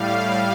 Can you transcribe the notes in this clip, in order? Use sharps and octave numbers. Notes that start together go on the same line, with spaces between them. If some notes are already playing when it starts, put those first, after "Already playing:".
Already playing: A2 G3 F5